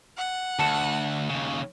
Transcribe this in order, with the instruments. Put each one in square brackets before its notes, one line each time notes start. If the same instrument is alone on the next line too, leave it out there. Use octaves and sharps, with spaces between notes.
[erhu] F#5
[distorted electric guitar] D2 [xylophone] A5 C#7 E7
[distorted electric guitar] D#2 C#3